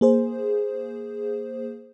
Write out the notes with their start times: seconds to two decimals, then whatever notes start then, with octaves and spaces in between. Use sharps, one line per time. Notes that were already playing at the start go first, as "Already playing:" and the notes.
0.01 A#3 G#4 C5